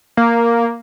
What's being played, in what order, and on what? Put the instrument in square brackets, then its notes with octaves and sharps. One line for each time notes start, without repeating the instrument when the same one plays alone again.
[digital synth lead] A#3